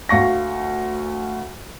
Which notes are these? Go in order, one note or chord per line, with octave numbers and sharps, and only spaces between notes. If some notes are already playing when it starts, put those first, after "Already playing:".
D2 F5 C#6 A#6